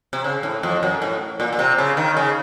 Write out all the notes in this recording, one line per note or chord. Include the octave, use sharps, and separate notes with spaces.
C3
C#3
A2
F2
F#2
A2
A#2
A#2
C3
C#3
D#3
C#3